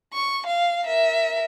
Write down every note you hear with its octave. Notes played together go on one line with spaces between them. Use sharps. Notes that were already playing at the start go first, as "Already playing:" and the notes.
C#6
F5
A#4 E5